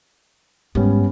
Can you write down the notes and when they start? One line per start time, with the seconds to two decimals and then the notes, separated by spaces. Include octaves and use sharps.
0.75 G#2 G3 B3 C#4